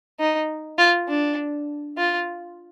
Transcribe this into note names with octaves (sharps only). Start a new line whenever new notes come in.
D#4
F4
D4
F4